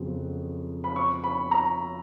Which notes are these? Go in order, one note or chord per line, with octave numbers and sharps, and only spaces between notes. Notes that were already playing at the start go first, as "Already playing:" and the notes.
Already playing: F2 C#3 F#3 B3
B5
C#6
B5
A#5